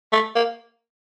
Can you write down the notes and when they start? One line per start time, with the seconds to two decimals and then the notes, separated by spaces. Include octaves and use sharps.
0.13 A3
0.35 A#3